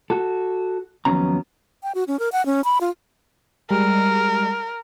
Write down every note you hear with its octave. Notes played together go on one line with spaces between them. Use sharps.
F#4 A4
D#2 F3 F#3 B3 C#4 A#5
G5
F#4
C#4
A#4
F#5
C#4
B5
F4
G3 G#3 A#4